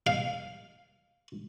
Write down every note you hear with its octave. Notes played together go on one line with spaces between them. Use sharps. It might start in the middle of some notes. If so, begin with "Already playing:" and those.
F5